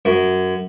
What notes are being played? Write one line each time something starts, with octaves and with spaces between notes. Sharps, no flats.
F#2